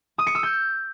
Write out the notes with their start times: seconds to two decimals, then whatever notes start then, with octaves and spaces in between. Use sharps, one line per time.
0.18 D#6
0.27 C#7
0.35 E6
0.43 G6